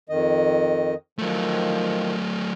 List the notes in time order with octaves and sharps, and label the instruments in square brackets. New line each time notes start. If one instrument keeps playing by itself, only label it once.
[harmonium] F2 D#3 D#5
[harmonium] D#3 F3 [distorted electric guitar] F#3 A3